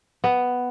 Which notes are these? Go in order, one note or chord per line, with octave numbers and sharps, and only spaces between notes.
B3